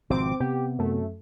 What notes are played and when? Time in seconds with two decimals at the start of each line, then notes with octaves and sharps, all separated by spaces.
0.10 G#1 B2 F3 C4 D6
0.40 C3 B3 G4
0.78 F#2 A3